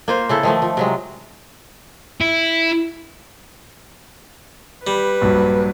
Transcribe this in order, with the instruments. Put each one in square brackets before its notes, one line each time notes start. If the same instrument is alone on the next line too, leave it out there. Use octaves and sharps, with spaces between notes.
[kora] A#3 F4 C5
C#3 E4 A4
D#3 F3 A3
F3
C3 F#3 G#3
[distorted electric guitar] E4
[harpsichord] G3 [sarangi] B4
[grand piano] A#1 G2 F#3